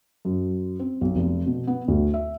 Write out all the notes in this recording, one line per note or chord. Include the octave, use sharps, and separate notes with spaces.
F#2
C4
B1
F1
B2
B3
D2
E5